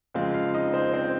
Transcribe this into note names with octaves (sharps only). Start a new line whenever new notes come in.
F2 C#3 F3 G#3 C4 F4 F5
F4 F5
D#4 D#5
C4 C5
C4 C5
C5